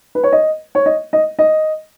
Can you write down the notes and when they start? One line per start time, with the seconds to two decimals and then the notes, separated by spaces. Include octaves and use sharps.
0.15 B4
0.24 C#5
0.32 D#5
0.75 C#5
0.86 D#5
1.13 D#5
1.39 D#5